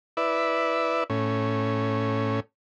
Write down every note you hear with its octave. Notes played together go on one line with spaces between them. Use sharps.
E4 B4 D5 E5
A2 C#4